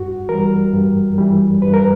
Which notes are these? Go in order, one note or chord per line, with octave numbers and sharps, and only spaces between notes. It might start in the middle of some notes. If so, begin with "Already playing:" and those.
Already playing: G2 F#4
E3 G3 A#4
G2
E3 G3
G2 B4
A#4